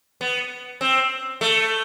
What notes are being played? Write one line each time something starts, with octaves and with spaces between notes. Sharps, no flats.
B3
C4
A3